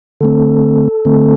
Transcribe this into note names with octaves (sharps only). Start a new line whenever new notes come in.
D3 A3 C4 A4
D3 A3 C4